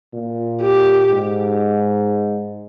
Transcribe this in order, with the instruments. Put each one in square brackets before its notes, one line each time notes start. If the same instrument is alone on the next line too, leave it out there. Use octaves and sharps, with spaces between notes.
[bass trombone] A#2
[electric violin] G4
[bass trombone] G#2